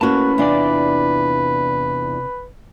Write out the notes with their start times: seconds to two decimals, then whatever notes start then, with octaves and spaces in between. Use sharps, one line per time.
0.01 A2 A#3 C#4 F#4 B4 A5
0.38 E2 C3 D4 F4 D5